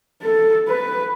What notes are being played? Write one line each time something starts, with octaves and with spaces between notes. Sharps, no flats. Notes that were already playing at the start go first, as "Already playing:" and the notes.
A4
B4